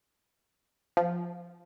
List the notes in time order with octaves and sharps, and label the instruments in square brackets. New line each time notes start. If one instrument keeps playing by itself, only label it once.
[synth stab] F3